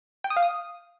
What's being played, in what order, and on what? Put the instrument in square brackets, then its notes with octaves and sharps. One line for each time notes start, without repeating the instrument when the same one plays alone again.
[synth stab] G5
D#6
F5
D#6